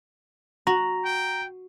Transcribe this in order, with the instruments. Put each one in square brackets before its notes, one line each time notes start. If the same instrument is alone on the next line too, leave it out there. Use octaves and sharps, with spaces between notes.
[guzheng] F#4 [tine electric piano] A#5
[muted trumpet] G5